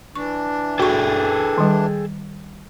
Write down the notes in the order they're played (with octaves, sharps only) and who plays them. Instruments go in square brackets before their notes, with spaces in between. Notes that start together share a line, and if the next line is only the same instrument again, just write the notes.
[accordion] E3 D4 [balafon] C#6
[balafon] F#4 C#6 [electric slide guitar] G#4 A4 G5
[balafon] D#3 G3